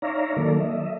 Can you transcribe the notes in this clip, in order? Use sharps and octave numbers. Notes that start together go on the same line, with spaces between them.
D#4 C#5 D5 E5 F5 A#5
D#3 F#3 A#3 A4 D5
D#5 E5